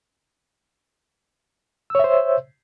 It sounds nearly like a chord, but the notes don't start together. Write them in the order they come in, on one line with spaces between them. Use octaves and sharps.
E6 C#5 E5 C5